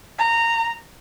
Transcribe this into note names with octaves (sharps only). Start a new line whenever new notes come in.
A#5